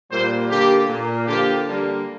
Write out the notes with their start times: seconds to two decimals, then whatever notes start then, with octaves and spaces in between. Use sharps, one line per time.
0.10 A#2 G3 A#3 C5
0.49 D3 A#3 G4
0.88 A#2 A#3
1.27 D3 F3 A#3 G4
1.66 D3 G3 A#3